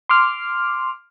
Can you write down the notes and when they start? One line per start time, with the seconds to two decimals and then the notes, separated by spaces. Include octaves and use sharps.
0.09 C6 D6 F6